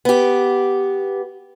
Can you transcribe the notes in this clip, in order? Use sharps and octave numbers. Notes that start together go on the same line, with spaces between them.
B3 G4